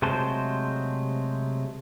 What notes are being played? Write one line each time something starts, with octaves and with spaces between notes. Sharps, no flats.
C3 F#3 G#3 A3 C5 A5